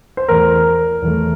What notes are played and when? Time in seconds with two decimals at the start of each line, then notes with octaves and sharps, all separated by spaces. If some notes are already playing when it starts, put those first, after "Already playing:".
0.17 C5
0.28 E2 E3 A3 A#4
1.02 E2 E3 A3